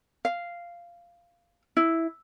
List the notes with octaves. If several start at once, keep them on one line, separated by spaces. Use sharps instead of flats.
F5
E4